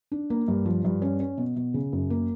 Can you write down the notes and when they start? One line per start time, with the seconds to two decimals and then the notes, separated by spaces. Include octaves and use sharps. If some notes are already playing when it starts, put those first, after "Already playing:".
0.12 D4
0.30 A#3
0.48 G2
0.66 F3
0.85 G2
1.02 C#4
1.20 C#4
1.38 B2
1.56 B2
1.74 C#3
1.93 F#2
2.10 A#3